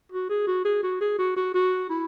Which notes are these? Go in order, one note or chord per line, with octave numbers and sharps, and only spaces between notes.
F#4
G#4
F#4
G#4
F#4
G#4
F#4
F#4
F#4
E4